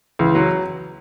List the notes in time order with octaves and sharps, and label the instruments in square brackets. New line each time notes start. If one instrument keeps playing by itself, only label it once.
[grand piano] C#2 [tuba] E3
[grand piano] F#3